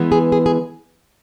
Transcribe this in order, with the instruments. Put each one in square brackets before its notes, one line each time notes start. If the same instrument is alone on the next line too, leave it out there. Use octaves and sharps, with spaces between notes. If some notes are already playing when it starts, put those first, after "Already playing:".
Already playing: [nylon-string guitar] E3 G#3 B3
G#4
G#4
G#4